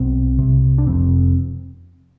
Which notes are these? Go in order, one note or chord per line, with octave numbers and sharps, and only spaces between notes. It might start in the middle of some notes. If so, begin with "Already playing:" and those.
Already playing: B1 B2 C4
C2 C3
D4
F1 F2 C3 C4